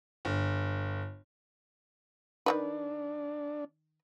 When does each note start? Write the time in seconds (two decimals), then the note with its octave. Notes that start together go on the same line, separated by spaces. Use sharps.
0.25 G1
2.46 D#3 A3 D4 B4